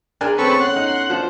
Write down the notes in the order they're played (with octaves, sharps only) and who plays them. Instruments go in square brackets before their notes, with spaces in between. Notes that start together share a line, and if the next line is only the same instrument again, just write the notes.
[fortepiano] D4 A#4 G#5 [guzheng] F4 G#4 F#5
[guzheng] E2 A3 C#4 [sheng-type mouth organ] C4 C#6 [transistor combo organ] A4 B4
[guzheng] C#5 [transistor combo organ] F#5 [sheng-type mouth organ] C6
[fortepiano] D#4
[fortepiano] F3 [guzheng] D4 [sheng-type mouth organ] C5